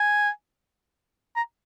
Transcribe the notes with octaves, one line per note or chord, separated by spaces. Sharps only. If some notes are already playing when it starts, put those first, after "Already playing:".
Already playing: G#5
A#5